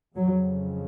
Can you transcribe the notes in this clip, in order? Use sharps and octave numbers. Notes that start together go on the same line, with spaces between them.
F2 C#3 F#3